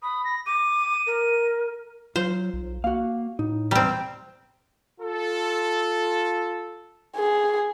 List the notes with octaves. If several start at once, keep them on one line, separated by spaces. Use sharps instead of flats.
B5 D#6
A#6
D6 D#7
A#4
F#3 F4 C5
B1
A#3 F#4 F5
A2 D#4
B1 E2 G3 C4 A#5
F4 A4
G#4